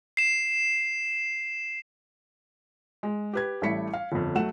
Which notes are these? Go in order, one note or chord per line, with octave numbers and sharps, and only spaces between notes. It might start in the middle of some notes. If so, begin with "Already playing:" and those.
C7 E7
G#3
G4 B4 G#6
A1 G3 A3 E4 B6 C#7
F5
G1 F2
F#3 A3 F#5 E7